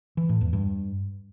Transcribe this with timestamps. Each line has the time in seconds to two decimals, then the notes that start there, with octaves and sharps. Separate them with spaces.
0.17 E3
0.29 A2
0.41 E2
0.53 G2